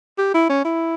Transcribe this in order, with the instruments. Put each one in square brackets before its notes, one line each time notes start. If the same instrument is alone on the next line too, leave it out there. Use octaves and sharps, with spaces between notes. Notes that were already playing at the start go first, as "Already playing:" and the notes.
[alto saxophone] G4
E4
C#4
E4